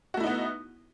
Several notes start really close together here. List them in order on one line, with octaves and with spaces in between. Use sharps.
F#4 A3 E4 D#4 B3